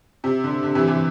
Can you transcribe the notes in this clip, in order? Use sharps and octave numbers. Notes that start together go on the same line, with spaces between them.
C3
D3
D3
C3 E3
C3 E3